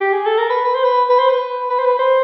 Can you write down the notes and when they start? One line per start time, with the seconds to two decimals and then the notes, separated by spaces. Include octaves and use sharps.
0.01 G4
0.14 G#4
0.26 A4
0.38 A#4
0.50 B4
0.65 B4
0.75 C5
0.84 B4
1.10 B4
1.19 C5
1.29 B4
1.70 B4
1.79 C5
1.85 B4
1.99 C5